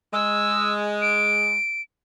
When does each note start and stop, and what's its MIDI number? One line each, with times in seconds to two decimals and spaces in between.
0.13 1.55 56
0.13 0.74 88
1.02 1.82 98